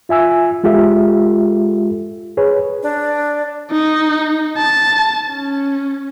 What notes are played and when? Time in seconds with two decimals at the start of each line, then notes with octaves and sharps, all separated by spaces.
0.09 F4 E5 G#5 E6
0.64 G#3 F4 G4 A4 E5
2.37 G#4 B4 C#5
2.83 D4
3.71 D#4
4.57 A5
5.30 C#4